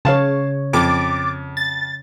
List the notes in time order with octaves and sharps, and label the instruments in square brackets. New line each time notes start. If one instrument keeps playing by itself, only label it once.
[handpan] C#3 C#5 [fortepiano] F5 A5
[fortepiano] F2 [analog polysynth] D6 A6
[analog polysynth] A6